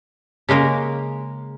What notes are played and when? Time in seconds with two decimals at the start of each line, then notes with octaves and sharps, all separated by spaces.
0.49 C#3 G#3 A#3 A#4